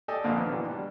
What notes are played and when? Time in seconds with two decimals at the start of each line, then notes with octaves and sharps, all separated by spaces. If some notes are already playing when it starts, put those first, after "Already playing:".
0.08 G4 A4 D5 D#5 G5 G#5
0.24 A#1 F2 A#2 D3 A#3
0.36 D#3 B3
0.50 B2 D3 E3
0.68 G3 D4